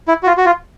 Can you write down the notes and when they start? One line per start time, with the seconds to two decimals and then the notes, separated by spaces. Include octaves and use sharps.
0.08 E4
0.23 F#4
0.27 F4
0.37 F#4
0.46 F4